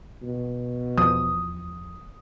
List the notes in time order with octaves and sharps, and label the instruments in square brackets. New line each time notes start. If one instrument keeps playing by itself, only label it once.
[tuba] B2
[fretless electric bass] E2 F3 [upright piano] D#6